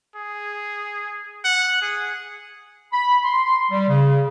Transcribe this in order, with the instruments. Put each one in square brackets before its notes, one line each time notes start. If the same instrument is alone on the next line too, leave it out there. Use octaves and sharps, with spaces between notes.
[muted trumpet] G#4
F#5
G#4
[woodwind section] B5
C6
G3
C#3